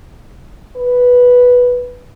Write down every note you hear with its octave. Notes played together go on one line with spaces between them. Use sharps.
B4